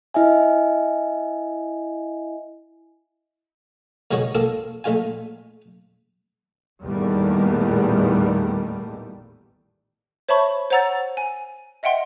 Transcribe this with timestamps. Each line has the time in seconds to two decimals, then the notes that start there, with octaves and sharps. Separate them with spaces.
0.14 E4 D#5 E5 G#5
4.11 F2 B2 D#3 G#3 F#4 C#5
4.35 A#3 C4 F4 A4 A#4
4.84 A#1 A3 F4 G#5
6.81 A1 E2 A#2 D#3 G3 A3
10.29 C5 C#5 E5 A5 B5 C#6
10.70 C5 C#5 F#5 A#5 E6 A6
11.17 G#5
11.83 D#5 E5 F#5 G5 C6